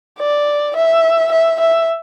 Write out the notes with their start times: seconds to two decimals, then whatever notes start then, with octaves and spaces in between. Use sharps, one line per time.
0.19 D5
0.76 E5
1.32 E5
1.60 E5